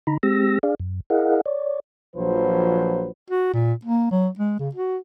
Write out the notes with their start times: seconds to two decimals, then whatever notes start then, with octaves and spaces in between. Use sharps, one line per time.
0.07 D3 D#4 A#5 B5
0.23 G#3 C4 G4 E6 A#6
0.63 D4 G#4 D5 F5
0.80 F#2
1.10 E4 G#4 A#4 D#5 F5 F#5
1.46 C#5 D5
2.16 A#1 F3 F#3 B4 C5
3.30 F#4
3.53 A#2
3.85 A#3
4.11 F#3
4.39 G#3
4.59 C#3
4.75 F#4